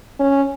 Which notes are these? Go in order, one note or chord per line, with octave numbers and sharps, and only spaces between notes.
C#4